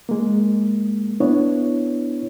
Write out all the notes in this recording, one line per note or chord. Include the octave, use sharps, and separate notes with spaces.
G#3 A#3
B3 D4 E4 C#5